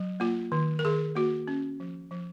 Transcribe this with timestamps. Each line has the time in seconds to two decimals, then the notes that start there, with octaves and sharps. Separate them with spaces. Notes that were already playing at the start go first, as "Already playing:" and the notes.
Already playing: F#3
0.20 A#3 F4
0.52 D#3
0.79 A#4
0.84 D#3 G#4
1.15 A#3 F#4
1.47 C#4
1.80 F3
2.11 F3